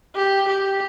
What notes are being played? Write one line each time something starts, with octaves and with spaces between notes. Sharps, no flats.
G4
G4